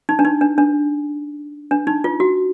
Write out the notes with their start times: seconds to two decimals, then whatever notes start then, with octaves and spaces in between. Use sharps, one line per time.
0.09 D#4
0.19 D4
0.25 D#4
0.41 D4
0.58 D4
1.71 D4
1.87 D#4
2.04 F4
2.20 F#4